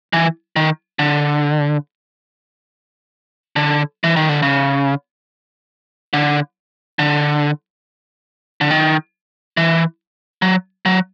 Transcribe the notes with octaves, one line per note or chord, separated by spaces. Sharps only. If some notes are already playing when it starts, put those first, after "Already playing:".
E3
D#3
D3
D3
E3
D#3
D3
C#3
D3
D3
D3
D#3
E3
F#3
F#3